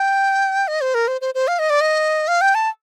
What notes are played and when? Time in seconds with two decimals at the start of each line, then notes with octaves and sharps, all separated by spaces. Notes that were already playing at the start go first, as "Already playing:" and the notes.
Already playing: G5
0.68 D#5
0.81 C5
0.94 A#4
1.08 C5
1.21 C5
1.35 C5
1.48 F5
1.59 D#5
1.70 D5
1.81 D#5
2.28 F5
2.41 G5
2.55 A5